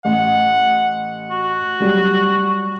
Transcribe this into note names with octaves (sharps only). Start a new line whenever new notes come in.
A1 F#5
F#4
F#3 G3